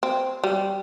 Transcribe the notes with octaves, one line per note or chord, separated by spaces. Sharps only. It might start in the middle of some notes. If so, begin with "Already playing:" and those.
C4
G3